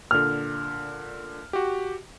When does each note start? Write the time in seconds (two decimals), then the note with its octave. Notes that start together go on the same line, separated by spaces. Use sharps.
0.11 A#2 D3 F6
1.53 F#4 G4